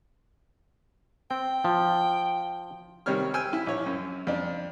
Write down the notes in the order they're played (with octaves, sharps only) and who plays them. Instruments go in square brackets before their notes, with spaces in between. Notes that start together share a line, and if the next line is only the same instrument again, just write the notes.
[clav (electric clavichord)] C4 [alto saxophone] G5
[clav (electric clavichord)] F3
[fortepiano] C3 D#3 G3 C4 C#5 F6
G5 G#5 E6 F6
E4
A#1 C#5
F#2
F2 D4